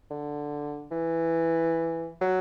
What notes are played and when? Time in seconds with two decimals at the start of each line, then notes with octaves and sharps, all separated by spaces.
0.11 D3
0.91 E3
2.21 F#3